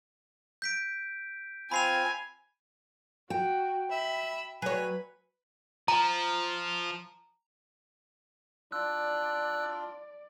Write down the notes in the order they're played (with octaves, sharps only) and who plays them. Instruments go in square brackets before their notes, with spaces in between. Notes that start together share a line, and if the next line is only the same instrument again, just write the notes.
[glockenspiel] G6 B6 D7
[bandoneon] C4 F4 [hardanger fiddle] G#5 [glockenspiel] B5 C7 F7
[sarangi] F#4 [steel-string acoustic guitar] G5
[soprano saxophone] E5 [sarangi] B5
[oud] F#3 C#5 [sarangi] B4 [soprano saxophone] G#5
[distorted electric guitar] F3 [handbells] A#5
[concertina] D4 F4 [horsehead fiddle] D5 [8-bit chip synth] E6 F#6